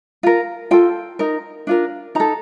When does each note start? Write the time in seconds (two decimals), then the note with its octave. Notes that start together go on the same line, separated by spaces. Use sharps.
0.23 F4 A#4
0.71 F4 A4 G5
1.19 D#4 A#4
1.67 D4 F4 A#4
2.15 D#4 A4 A#5